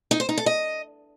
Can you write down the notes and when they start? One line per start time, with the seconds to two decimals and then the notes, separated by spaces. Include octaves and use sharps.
0.11 D#4
0.20 C5
0.29 D#4
0.38 A4
0.46 D#5